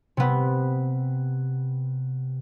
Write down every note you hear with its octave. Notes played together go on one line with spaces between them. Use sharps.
C3 B3